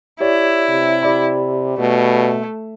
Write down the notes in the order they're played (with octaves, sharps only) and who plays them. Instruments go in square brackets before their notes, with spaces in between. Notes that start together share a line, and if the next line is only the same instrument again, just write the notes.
[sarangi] E4 [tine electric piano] G4 C#5 D5
[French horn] C3
[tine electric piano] G4 D5 B5
[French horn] B2 [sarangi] A3